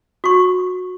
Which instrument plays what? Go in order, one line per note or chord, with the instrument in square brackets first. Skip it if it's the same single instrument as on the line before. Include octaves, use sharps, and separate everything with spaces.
[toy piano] F#4 C#6